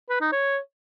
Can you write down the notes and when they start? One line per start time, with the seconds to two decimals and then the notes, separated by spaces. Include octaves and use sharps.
0.10 B4
0.21 D#4
0.32 C#5